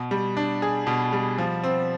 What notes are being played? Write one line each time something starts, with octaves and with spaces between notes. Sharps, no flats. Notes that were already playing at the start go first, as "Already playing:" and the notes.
Already playing: B2
G3
D4
G#4
B2
G3
F3
C4